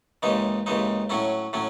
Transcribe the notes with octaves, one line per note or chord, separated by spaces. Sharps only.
D#2 C#3 E3 G#3 D#4
D#2 C#3 E3 G#3 D#4
A2 F#3 C#4 E4
A2 F#3 C#4